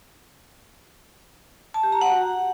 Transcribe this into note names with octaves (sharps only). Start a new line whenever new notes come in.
A5
G4
A#5
F#5
F#4